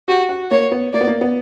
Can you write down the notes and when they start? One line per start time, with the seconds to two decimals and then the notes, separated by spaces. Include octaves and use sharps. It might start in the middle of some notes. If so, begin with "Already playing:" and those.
0.08 F#4 G4
0.29 F#4
0.51 A#3 C#5
0.72 B3
0.93 A#3 D5
1.01 B3
1.07 A#3
1.21 B3